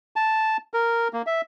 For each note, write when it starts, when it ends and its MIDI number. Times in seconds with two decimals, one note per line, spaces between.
0.16 0.57 81
0.74 1.08 70
1.13 1.22 58
1.27 1.41 76